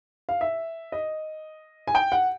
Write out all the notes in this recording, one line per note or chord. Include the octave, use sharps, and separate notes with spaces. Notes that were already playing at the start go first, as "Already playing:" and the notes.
F5
E5
D#5
G#5
G5
F#5